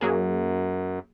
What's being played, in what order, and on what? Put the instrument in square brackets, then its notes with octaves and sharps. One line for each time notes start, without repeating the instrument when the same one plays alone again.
[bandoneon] F#2 [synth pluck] F#3 A#3 G#4